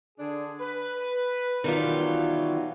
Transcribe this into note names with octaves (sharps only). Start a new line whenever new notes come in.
D3 D4 G#4
B4
B2 D#3 E3 F#3 G3 F4